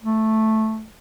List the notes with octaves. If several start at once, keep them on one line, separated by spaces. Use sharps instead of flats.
A3